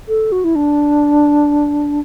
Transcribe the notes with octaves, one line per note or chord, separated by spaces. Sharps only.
A4
F#4
E4
D4